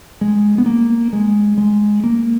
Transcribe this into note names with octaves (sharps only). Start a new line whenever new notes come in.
G#3
B3
A#3
G#3
G#3
A#3